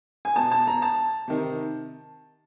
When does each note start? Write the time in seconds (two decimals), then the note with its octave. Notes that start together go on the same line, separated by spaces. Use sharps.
0.25 G#5
0.36 B2 A5
0.51 A5
0.67 A#5
0.82 A5
1.28 C3 D#3